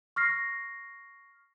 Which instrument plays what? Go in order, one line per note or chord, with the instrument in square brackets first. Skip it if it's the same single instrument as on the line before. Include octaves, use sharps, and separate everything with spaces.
[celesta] C#6 F6 A#6 C7